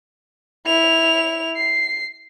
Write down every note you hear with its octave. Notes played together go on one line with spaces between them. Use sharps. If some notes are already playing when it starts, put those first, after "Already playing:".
E4 F7
C7